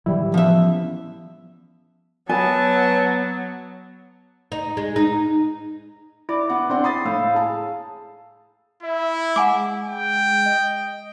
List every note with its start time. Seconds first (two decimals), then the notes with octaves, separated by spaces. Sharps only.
0.06 A2 D#3 E3 F#3 G3 E4
0.34 F3 B3 C#4 E5
2.29 F#3 B3 B4 G#5 A5
4.52 D#4
4.77 G#3
4.96 D#4
6.29 E4 D5 D6
6.49 B3 F#5
6.69 C4 D4 F#5 C6
6.84 B5 D#6 A6 C7
7.05 A2 F5 E6
7.34 G#4 A5
8.83 E4 E5
9.36 G#3 F#5 G#5 D6
9.88 G5
10.46 D#5